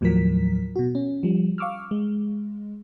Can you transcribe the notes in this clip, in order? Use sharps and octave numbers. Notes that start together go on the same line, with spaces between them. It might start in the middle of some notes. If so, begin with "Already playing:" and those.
D#2 A2 F3 F#3 A#4 B6
B2 F#4
C#4
F3 G3
F5 C#6 D6 E6 F6
G#3